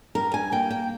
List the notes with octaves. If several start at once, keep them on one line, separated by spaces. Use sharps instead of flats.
G2 A#4
G#5
A#3 G5
G5